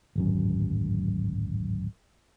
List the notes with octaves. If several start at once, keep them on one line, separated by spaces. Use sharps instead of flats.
D1 G#1 F#2